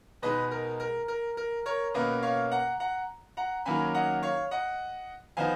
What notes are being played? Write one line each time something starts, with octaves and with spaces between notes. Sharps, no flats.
B2 G#3 D#4 B4 D#5
A#4
A#4
A#4
A#4
A#4 C#5
B2 A#3 C#4 B4 D#5
C#5 F5
F#5 A#5
F#5 A#5
F#5 A#5
D#3 F#3 A#3 C#4 G#5 B5
D#5 F#5
C#5 F5
D#5 F#5
F3 B3 D#4 F5 G#5